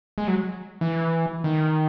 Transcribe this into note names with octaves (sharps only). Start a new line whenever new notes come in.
G#3
F#3
E3
D#3